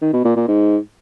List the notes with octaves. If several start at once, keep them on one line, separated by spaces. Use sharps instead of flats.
D#3
B2
A#2
A#2
G#2